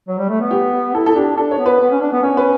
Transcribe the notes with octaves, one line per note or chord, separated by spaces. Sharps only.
F#3
G3
A3
B3
G4
E4 A4
A4
D4 G4
D4 A4
C#5
B3
B4
B3
C#4
D4
B3
C#4 C#5
B4